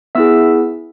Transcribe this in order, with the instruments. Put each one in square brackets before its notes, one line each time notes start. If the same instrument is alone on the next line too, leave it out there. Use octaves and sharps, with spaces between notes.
[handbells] B3 E4 G#4 E5 E6